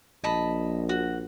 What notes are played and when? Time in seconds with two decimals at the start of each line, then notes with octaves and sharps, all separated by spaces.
0.24 A#1 D#5 A5 B5
0.89 F#4